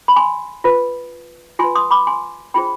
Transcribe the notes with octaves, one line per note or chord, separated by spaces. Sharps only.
B5
G#5 C6
F4 B4
F4 B4 G#5 C6
C6 D#6
B5 D6
G#5 C6
D4 F4 G#4 C5 G5 B5